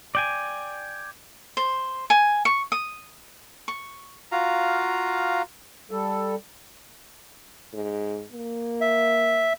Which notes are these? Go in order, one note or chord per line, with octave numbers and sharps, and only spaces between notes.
D5 G5 G#5
C5
G#5
C#6
D#6
C#6
F4 F#4 F5 A#5
G3 A4
G#2
A#3
E5